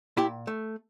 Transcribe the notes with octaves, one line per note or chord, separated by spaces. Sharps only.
A#2 E4 G4
A3